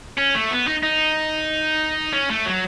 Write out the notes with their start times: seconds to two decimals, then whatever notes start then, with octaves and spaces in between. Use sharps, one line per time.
0.18 C#4
0.35 A3
0.51 B3
0.67 D#4
0.83 D#4
2.13 C#4
2.30 A3
2.46 F#3